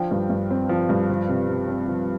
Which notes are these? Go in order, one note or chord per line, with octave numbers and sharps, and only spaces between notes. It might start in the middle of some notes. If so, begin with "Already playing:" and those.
Already playing: F3 D4 G5
G2
G2
C4
F3
G2
F3
C3
C3
C4
F3